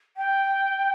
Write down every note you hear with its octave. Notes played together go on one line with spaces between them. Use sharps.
G5